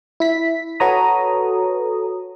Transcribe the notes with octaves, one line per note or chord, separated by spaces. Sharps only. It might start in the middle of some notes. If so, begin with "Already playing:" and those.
E4 B6
F#4 A4 B4 C#5 A#5 D#6